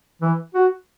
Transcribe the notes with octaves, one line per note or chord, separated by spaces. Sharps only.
E3
F#4